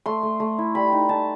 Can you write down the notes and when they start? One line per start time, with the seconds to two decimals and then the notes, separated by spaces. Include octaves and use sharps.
0.06 A3 C6
0.23 A3
0.40 A3
0.58 E4
0.75 G3 B5
0.92 D#4
1.09 D#4 A5